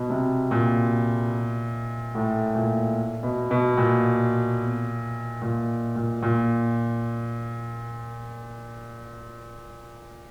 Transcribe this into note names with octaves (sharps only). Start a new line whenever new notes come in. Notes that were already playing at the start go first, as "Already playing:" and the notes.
Already playing: B2
C3
A#2
A2
A#2
B2
B2
A#2
A#2
A#2
A#2